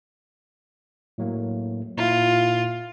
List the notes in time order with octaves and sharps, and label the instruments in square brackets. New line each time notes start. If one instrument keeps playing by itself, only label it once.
[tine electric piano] A2 F#3 A#3
[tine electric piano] A#2 E4 [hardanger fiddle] F4